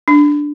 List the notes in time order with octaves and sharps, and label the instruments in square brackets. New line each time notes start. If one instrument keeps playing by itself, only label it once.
[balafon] D4